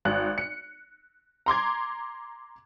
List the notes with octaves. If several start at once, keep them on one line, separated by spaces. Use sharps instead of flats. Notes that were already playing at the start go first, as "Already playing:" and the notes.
G#1 F#6
C#7
A#5 C6 D6 G#6